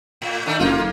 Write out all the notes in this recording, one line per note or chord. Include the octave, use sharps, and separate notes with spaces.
A2
D#3 A3 D4
F#1 A#3 F4